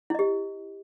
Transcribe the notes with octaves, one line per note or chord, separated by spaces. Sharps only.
E4 G4 D#5